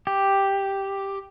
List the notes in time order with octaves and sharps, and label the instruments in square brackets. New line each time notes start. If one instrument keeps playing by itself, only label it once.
[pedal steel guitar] G4